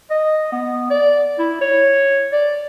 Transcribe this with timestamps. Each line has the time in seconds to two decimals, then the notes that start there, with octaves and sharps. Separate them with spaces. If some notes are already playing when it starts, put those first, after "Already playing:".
0.11 D#5
0.52 B3
0.91 D5
1.39 E4
1.61 C#5
2.33 D5